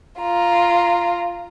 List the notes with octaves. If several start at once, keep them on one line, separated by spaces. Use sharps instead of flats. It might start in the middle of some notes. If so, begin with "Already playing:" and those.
F4 A#5